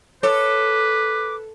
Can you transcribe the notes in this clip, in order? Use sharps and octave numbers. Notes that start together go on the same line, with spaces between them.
A4 B4 C#5 D6